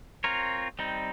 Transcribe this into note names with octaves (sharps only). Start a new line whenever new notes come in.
C4 F4 A#4 C#5
G3 C4 D#4